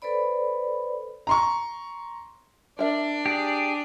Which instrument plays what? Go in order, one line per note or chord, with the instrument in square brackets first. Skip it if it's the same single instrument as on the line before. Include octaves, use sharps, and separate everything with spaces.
[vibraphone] A4 B4 C5 D5 B5
[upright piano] A#5 C6 C#6
[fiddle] D4 D5 [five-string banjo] A#4 E5
[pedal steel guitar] G4 G#4